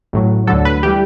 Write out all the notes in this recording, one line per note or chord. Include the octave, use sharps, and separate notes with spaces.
A1 A2 F#3
D2 D3 F#3 A4
B4
E3 G3 G4